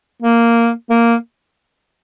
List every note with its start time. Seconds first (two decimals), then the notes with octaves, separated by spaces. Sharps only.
0.22 A#3
0.90 A#3